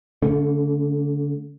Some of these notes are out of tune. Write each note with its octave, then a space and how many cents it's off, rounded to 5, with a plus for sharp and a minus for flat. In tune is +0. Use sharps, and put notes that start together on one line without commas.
D3 -35 A3 +0 C#4 +5